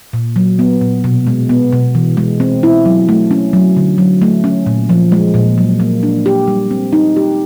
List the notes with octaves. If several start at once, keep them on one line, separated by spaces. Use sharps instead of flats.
A#2
F#3
B3
A#2
B2
G#3
B3
B2
E3
G#3
C4
E4
F#3
A3
C#4
F#3
D3
F#3
A3
C#4
A#2
F3
G#3
A#2
F#3
A#3
D4
G4
G3
C4
D#4
G4